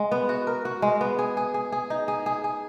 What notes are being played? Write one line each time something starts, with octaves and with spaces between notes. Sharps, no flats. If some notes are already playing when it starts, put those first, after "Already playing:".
Already playing: G#3
B3
F#4
A#4
F#4
G#3
B3
G#4
G#4
G#4
G#4
D#4
G#4
G#4
G#4